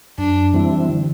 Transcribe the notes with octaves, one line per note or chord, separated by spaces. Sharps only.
F#2 D4
E3 G3 C4 E4
D3